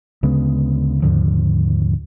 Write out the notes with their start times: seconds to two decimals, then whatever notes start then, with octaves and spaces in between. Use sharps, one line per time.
0.23 D2 C#3 G#3 B3
1.02 D#2 G#2 D3 F3